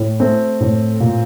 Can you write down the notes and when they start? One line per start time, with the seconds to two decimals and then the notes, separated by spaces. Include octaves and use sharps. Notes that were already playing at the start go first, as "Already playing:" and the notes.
Already playing: A2
0.20 A3 C4
0.60 A2
1.00 A#2